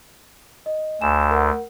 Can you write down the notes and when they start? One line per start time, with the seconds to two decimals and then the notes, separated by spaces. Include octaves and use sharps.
0.66 D#5
1.01 D2 G#5 E7
1.31 A#4 F#5